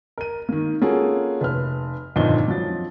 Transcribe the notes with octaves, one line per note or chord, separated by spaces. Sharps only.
A#4 D#7
D#3 A#3
A#3 C#4 F4 F#4 G#4 A4
F1 B4 F6
G1 F2 A#2 D#3 D#5 G7
F3 F#3 A6